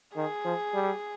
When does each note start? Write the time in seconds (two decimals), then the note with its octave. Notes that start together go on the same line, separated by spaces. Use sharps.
0.16 D#3 G#4
0.45 F3
0.74 G3